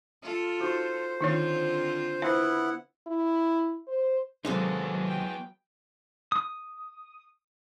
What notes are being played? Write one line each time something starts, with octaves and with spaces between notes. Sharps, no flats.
F4 A4
D#4 F#4 C5
D3 D#3 C4 D#4 F4 C#5
B3 E4 C5 F#5
E4
C5
D#2 C3 F#3 G#3 B3 D#4 G#4 A4
G5
D#6